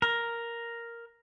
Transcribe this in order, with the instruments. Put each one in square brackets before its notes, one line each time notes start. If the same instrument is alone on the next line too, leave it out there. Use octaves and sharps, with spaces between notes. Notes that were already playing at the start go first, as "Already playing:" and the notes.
[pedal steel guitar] A#4